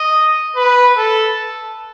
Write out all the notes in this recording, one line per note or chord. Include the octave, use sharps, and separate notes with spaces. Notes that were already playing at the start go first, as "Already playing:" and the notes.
Already playing: D#5
B4
A4